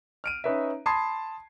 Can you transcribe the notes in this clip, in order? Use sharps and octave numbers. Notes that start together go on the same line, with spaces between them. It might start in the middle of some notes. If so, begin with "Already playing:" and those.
F6 D7 D#7
C#4 D#4 B4 C#5 E5
A5 B5 C6 D#6 G#6 C7